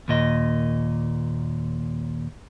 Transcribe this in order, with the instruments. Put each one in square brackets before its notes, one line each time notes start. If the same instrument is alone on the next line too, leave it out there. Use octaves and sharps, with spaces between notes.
[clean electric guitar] D#2 A#2 D#5